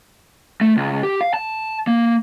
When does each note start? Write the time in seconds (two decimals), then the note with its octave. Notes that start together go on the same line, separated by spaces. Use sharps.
0.61 A3
0.77 C#2
1.03 G4
1.21 F5
1.34 A5
1.87 A#3